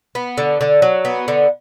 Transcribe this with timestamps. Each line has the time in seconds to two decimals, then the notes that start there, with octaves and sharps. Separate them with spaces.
0.15 B3
0.38 D3
0.61 D3
0.82 F#3
1.05 B3
1.28 D3